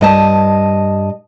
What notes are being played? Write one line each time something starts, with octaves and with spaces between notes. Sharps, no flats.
G2 D#5 A5